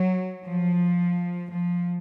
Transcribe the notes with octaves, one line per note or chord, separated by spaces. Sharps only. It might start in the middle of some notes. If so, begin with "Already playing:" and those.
Already playing: F#3
F3
F3